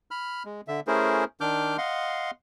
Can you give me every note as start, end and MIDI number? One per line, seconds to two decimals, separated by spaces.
0.11 0.43 83
0.11 0.43 89
0.45 0.61 56
0.68 0.80 50
0.68 0.80 76
0.87 1.24 57
0.87 1.24 61
0.87 1.24 64
0.87 1.24 68
0.87 1.24 70
0.87 1.24 72
1.41 1.77 51
1.41 1.77 62
1.41 1.77 86
1.41 1.77 89
1.41 1.77 91
1.78 2.31 75
1.78 2.31 77
1.78 2.31 78
1.78 2.31 84